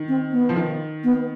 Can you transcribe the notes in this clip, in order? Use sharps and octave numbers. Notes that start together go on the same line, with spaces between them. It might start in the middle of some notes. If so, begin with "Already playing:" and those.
Already playing: D#3
C4
B3
F3
D#3
B3